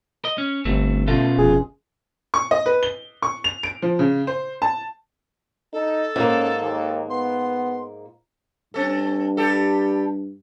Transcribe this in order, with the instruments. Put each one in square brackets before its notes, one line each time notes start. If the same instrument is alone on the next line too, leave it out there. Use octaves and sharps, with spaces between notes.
[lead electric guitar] D#5
C#4
[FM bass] G1 [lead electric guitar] A3 C4
[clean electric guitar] B1 C#4 C6 [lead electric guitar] B2 F4 [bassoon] A3
[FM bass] F1 [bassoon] G#4
[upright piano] C#6
D#5
B4
G7
C#6
F7
D7
F3
C#3
C5
A5
[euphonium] D#4 [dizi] A4
[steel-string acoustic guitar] G#2 A#3 [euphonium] C#4
[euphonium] D#2
[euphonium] B3 [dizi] C6
[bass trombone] G2 [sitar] C4 A4
[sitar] G3 G4 A4